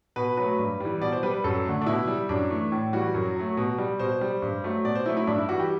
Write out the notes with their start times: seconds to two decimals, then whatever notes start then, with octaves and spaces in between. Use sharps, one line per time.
0.16 B2 B4
0.37 F#3 A3 B4
0.59 G2
0.80 E3 G3
1.01 B2 D5
1.12 C5
1.23 G3 B4
1.34 B4
1.44 F#2 A4
1.65 D3 A3
1.82 D4
1.86 B2 E4
2.08 G3
2.29 F#2 D4
2.50 E3 A3
2.72 A2
2.93 E3 G3 F#4
3.14 F#2
3.36 F#3 A3
3.57 B2
3.78 G3
3.99 B2 C5
4.21 G3
4.42 G2
4.64 F#3 A3
4.84 B2 D5
4.95 C5
5.06 F#3 A3 E4
5.17 E4
5.27 G2 D4
5.38 E4
5.49 E3 G3 F#4
5.60 G4